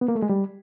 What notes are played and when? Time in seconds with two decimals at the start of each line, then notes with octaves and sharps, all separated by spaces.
0.01 B3
0.08 A#3
0.15 A3
0.22 G#3
0.29 G3